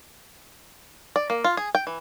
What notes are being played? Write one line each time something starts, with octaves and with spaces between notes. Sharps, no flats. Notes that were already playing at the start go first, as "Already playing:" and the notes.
D5
A#3
F4
G#4
G5
E3